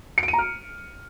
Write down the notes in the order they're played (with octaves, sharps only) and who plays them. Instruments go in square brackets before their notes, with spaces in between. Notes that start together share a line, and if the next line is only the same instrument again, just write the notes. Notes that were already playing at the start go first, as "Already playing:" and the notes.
[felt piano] C#7
D7
D#7
A#5
F6